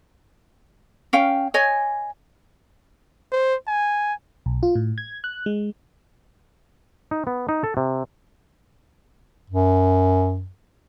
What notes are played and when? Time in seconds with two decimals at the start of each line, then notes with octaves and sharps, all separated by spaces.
1.13 C#4 F5 G5
1.54 C#5 D#5 G#5
3.32 C5
3.67 G#5
4.46 B1
4.63 F4
4.75 A2
4.98 G#6
5.24 F#6
5.46 G#3
7.11 D#4
7.27 B3
7.49 D#4
7.64 A4
7.77 C3
9.50 F#2